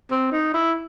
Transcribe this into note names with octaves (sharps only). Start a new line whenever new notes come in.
C4
D#4
E4